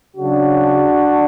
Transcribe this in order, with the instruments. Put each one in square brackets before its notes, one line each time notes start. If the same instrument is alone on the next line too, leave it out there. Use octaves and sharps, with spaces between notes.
[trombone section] C#3 F#3 D4 F#4